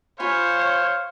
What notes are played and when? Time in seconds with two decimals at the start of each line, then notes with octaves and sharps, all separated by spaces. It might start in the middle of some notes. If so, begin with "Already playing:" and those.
0.20 F4 C5 C#5 F5 G#5 B5